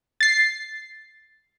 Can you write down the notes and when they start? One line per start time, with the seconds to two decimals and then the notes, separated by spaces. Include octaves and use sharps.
0.21 A6 C7